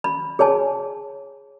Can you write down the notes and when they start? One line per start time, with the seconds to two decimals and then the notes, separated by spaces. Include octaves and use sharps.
0.04 B5
0.39 G#4 C#5 G#5 A5